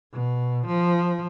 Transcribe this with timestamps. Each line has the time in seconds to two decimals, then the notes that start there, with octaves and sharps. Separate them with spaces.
0.13 B2
0.67 F3